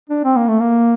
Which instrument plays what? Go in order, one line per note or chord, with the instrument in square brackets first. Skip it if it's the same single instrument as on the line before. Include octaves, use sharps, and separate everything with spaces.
[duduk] D4
C4
A#3
A3
A#3